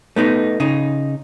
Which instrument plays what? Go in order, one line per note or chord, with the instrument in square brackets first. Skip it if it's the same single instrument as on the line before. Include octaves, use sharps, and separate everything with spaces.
[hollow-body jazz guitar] A3 B3 D#4
C#3 D#4